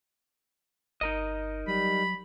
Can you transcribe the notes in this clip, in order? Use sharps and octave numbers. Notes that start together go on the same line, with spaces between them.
G1 D#4 A#4 D#5
F#3 G3 B5